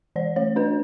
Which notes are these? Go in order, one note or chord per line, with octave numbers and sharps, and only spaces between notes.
E3 D5
A3 C#5
D4 B4